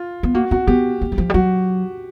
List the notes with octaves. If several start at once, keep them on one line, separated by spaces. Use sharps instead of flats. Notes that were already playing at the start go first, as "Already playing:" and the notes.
Already playing: F4
B3
A#3 F#4
C4 F#4
B3 G4
A#3
F#3
F3
G3
F#3 F#4